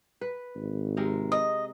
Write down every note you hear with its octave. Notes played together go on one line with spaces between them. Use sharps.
B4
G#1
C3 G#3 A#4
D#5